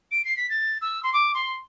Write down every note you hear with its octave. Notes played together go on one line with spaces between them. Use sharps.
D7
C7
B6
A6
E6
C6
D6
C6